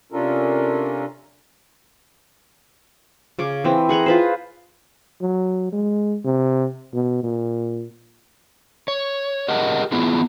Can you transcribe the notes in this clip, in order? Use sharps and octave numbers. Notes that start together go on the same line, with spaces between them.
C3 C#4 D4 F4 A4 A#4
C#3 C#4 D6
E3 C4
G#4 F#5 G#5 A#5
F4 B4 C5
F#3
G#3
C3
B2
A#2
C#5
G4 G#4 A#4 D#5 F#5
B3 E4 F4 G#4